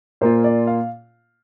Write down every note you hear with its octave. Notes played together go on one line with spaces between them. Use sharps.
A#2 A#3 F4 C5
D5
F5